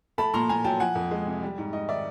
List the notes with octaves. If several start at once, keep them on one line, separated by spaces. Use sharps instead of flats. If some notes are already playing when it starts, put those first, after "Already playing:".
A3 A5 B5
A#2 A#5 C6
A#2 G#5 A#5
F#3 G5 A5
F3 F#5 G#5
F2
G#3
C3
G3
G#2
G#2 D#5
D#3 D5 E5